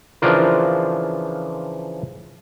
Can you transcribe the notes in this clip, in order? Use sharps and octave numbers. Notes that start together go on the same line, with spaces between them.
C#3 E3 F3 D4 F4 A#4